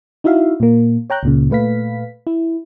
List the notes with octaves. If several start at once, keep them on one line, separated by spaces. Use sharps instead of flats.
D#4 E4 F#4 E5 F5
A#2 A#3
C#5 G5 A#5 F#6 G6
C#2 A#2 C#3
A#2 A3 B4 F5 B6
E4